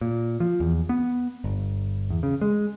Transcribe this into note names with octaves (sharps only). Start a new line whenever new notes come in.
A#2
F3
E2
B3
G1
E2
C#3
G#3